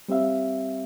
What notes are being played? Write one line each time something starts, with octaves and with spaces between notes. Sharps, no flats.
G3 C4 G4 E5 F5